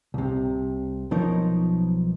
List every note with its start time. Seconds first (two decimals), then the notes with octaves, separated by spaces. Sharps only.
0.14 C2 C3
1.11 B1 F3 D#4 A#4 C#5